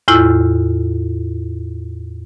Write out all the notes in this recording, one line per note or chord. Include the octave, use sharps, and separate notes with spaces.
E2 A2 E4 F4 E6